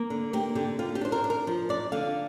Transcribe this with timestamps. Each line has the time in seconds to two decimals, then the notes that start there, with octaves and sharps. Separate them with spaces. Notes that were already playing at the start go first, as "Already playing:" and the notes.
Already playing: A#3
0.10 D3
0.33 A#3 G4
0.55 D3 G4
0.79 D3 F4
0.95 G4
1.01 D4 C5
1.12 A#4
1.24 D4
1.30 A#4
1.47 F3
1.69 D4 D5
1.92 D3 F5